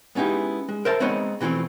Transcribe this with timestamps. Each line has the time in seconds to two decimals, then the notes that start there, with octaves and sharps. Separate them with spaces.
0.15 G#3 B3 C#4 D#4 E4 G4
0.69 G#3
0.85 A#4 C5 E5 A5
1.00 G#3 B3 C4 D#4 C#5 D#5
1.41 B2 E3 F3 A3 C4